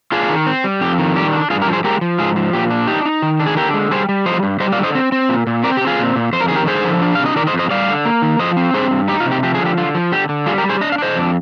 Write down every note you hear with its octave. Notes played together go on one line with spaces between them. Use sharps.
D4 F4 G#4
D#3
C4
G3
F2 G4
D#3
G3 G4
D4
G2 F4 G#4
G4 A#4
F3
G#4 C5
G#3 G4 A#4
F3
G#2 F4 G#4
F3
A#2 G4
D4
D#4 G4
D#4
D#3
D4
G#4
D3 G4 A#4
G#3
G3 G#4 C5
G3
F3 C5 D#5
G2
G3 C5 D#5
D5 F5
D3
C5 D#5
C4
C4
A#2
A#2
C4 A#4 D5
C4 G4
F4 G#4
A#2
A#2
F2 C5
A#4
D#3 G#4
G4 A#4
D3 G#4 C5
F3
D4
C3 F5
D#5
D#3 A#4 D5
C5 D#5
F2
C5 D#5
G3 D5 F5
D3
A#3
D#3
F3 C5 D#5
C4
G2 G#4 C5
G2
D#4 G4
F4
C3
G4
F3 G4
G#4
D3
G4
D3 F4
F3
D3 G4
D3
G3 F4 G#4
G4 A#4
G3
G#4 C5
D4 D#5
F5
D4 C5 D#5
F2